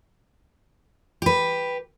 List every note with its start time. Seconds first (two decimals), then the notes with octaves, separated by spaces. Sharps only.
1.22 G4 B4